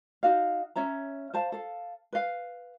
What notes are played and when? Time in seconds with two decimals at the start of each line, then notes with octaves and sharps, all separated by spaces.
0.23 D#4 F#4 F5
0.76 C#4 C#5 E5 A#5
1.34 C5 F5 A5
1.52 A4 F5
2.13 B4 F5